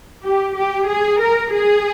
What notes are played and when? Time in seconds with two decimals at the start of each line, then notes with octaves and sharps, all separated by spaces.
0.23 G4
0.57 G4
0.89 G#4
1.22 A#4
1.54 G#4